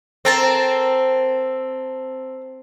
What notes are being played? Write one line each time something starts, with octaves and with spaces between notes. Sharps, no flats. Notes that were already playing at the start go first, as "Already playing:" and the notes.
C4 A4 A#4 A5